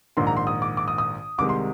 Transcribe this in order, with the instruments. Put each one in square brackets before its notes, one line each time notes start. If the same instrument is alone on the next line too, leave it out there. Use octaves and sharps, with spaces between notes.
[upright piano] A#1 G#2 D#3 C6
A#5
C6
D#6
D6
D6
D#6
D#6
C2 C3 D#3 G#3 D6
C6